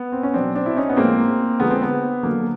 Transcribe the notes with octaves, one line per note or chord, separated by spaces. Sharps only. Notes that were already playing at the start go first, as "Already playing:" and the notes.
Already playing: B3
C4
C#4
B2 F#3 C4 D4
C4 D4
E4
C#4 D#4
B3
A2 F3 G#3 A#3 C4
D3 F3 G#3 B3
C4
B3
D3 F#3 A#3